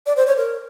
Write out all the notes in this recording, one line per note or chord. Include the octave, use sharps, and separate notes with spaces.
D5
C5
C#5
A#4